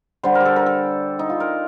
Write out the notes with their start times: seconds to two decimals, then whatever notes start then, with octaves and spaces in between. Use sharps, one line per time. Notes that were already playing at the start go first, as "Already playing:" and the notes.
0.23 D3 G3 C5
0.35 A#4
0.40 G4 A4
0.56 A#4
0.66 A4
1.19 D#4
1.30 F4
1.40 A#4